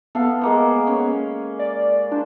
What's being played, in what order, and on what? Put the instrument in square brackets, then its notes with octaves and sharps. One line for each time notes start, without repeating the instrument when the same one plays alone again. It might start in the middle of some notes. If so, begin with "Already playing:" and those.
[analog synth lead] B3 [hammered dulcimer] A4 F5
[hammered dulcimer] G#3 A#3 C5
C#4
[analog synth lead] D5
[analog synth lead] D4 [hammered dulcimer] C5